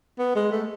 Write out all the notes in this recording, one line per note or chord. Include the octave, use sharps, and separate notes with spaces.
B3
G#3
A3